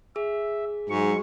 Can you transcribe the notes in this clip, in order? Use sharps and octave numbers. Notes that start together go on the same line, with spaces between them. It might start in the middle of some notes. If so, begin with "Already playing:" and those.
G#4 E5
G#2 F#3 G#3 C#6